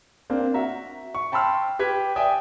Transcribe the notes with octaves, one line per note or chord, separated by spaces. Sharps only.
A#3 C4 D4
F#4 E5 A#5
C#6
G5 A5 B5 C6 E6 F6
G4 B4 G#6 B6
D5 E5 G5 G#5 D#6